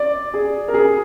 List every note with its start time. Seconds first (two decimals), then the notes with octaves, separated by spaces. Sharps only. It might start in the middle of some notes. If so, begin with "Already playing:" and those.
Already playing: D5
0.34 G#4
0.68 A#4
0.74 G#4